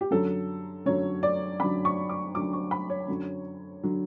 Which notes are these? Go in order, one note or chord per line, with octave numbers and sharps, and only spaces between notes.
G4
F#2 D3 F#3 A4
F#2 D3 F#3 C#5
D5
F#2 D3 F#3 B5
C#6
D6
F#2 D3 F#3 D6
C#6
B5
C#5
F#2 D3 F#3
D3 F#3